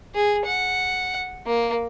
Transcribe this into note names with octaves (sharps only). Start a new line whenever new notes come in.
G#4
F#5
A#3